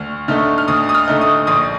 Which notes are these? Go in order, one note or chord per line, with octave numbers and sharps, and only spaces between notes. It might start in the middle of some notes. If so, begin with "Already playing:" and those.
Already playing: D2 F6
D3 A3 D#4 F6
F6
D2 D#6
D#6
F6
D3 A3 D#4
D#6
A#1 D#6